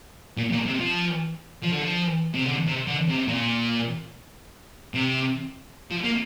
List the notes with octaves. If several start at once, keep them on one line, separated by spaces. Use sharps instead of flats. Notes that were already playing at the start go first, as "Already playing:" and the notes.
A#2
A#2
C3
F3
F3
D3
F3
C3
D3
C3
D3
C3
A#2
C3
F3
A#3